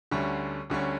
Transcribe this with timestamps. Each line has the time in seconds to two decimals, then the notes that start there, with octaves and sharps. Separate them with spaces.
0.11 D2 D3 G3 C#4
0.70 D2 D3 G3 C#4